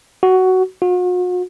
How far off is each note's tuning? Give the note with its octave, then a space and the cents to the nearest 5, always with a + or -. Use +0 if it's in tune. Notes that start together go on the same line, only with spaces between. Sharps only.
F#4 +10
F#4 -45